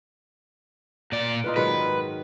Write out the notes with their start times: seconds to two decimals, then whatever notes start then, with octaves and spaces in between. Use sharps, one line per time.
1.12 A#2 D5
1.44 D#4 F4 B4
1.56 G#2 D#3 F#3 B4